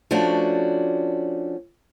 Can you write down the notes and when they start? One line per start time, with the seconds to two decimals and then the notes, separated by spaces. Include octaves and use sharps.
0.11 F3 A3 C#4 D4 F#4